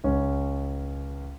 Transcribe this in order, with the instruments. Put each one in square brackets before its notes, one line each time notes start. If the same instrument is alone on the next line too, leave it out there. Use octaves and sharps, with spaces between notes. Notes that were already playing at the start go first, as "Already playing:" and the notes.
[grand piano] C#2 C#4